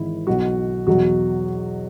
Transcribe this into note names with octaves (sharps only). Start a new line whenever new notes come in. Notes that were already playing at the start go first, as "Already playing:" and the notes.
Already playing: G#1 G#2 E3 E4
B1 B2 F#3 F#4
E2 B2 F#3 F#4